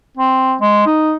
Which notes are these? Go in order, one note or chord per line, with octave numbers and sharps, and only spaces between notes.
C4
G#3
D#4